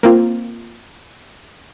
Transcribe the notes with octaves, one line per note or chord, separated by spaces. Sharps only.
A#3 C4 F4